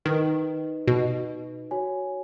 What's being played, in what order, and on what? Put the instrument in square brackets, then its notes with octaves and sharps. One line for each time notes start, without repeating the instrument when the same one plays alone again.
[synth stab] D#3 [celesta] D#4 B4 D#5
[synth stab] B2
[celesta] F#4 C#5 G#5